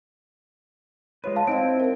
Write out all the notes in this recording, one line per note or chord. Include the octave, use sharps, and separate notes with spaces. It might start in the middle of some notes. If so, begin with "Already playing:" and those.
G#3 F4 B4 C#5
F5 A5
C4 D#4 E4 D#5 G5 D7
A#4 C5